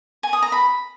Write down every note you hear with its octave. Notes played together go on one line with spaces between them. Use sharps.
G#5
D#6
A#5
B5